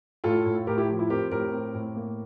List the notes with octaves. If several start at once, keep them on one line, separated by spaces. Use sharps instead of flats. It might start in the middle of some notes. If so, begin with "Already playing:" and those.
A2 F4 A4
A2
A2 G4 A#4
E4 G4
F3
E4
C4 G4 A#4
A2 G4 A#4
C4
A2
A#3